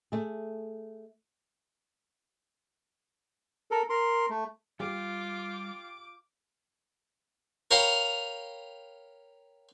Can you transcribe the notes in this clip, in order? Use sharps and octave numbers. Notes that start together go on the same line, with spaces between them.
A3 G#4
A4 A#4
A#4 C6
A3
G3 F4 G4 D6
A#4 C#5 F5 G5 A#5 B5